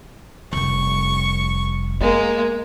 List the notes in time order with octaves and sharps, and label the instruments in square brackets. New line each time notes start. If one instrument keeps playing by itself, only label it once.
[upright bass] F1 G3 [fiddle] C#6
[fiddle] G#3 A#3 [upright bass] B3